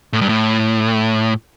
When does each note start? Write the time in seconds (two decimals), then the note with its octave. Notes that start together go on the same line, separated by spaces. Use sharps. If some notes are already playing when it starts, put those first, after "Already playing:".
0.13 A2
0.21 G2
0.29 A2